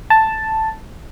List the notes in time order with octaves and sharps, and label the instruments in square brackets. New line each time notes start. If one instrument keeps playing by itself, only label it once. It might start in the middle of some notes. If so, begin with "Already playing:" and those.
[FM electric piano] A5